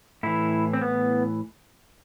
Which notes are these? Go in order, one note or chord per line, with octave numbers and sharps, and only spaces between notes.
A2 E3 E4
C4
B3